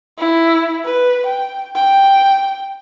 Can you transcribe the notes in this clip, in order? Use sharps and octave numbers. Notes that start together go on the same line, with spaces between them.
E4
B4
G5
G5